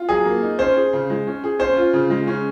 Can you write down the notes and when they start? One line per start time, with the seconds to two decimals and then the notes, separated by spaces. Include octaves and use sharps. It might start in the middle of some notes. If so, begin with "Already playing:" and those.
Already playing: F4
0.09 F#3 G#4
0.25 A#3
0.42 D#4
0.59 C#4 C5
0.76 G#4
0.93 C#3
1.10 G#3
1.27 C#4
1.44 G#4
1.59 C#4 C5
1.77 F4
1.93 C#3
2.10 G#3
2.27 C#4